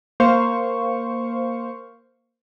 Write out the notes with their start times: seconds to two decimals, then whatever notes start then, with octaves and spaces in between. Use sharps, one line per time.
0.20 A#3 C5 F5 C#6